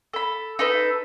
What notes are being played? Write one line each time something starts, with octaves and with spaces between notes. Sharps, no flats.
A4 B5
D#4 A4 B4